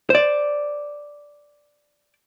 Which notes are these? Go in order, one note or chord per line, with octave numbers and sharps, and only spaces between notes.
C5 D5